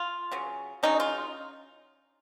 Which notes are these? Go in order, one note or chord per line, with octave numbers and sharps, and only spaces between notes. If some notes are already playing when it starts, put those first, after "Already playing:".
Already playing: F4
C#3 F#3 C#4
C#3 F#3 C#4 D#4
F4